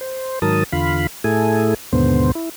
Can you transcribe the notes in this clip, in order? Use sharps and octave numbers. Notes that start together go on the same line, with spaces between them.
C5
G#2 D#3 F#3 A#4 A5 D#6
E2 D3 F4 F5 B5
A2 A3 E4 G#4 A4 G#5
D#2 G#2 B2 D3 B3 C5
E4